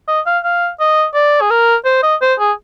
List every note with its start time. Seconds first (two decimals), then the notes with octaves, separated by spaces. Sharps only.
0.08 D#5
0.26 F5
0.44 F5
0.80 D#5
1.14 D5
1.42 G#4
1.51 A#4
1.85 C5
2.03 D#5
2.22 C5
2.39 G#4